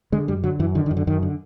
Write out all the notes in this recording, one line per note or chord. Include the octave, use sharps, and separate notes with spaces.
D3 G#3
F#2 G3
D3 F#3
F#2 E3
D3 D#3
D#3
F#2
D3
F#2 D#3
D3